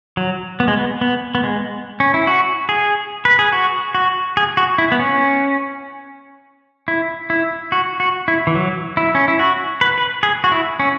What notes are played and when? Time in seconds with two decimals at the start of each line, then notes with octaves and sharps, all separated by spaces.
0.17 F#3
0.60 B3
0.68 G#3
0.77 B3
1.01 B3
1.35 B3
1.44 G#3
2.00 C#4
2.14 E4
2.27 F#4
2.69 G#4
3.25 B4
3.39 G#4
3.53 F#4
3.95 F#4
4.37 G#4
4.57 F#4
4.78 E4
4.92 B3
5.00 C#4
6.88 E4
7.30 E4
7.72 F#4
8.00 F#4
8.28 E4
8.47 E3
8.55 F#3
8.97 E4
9.15 C#4
9.28 E4
9.39 F#4
9.81 B4
9.98 B4
10.23 G#4
10.44 F#4
10.52 E4
10.80 C#4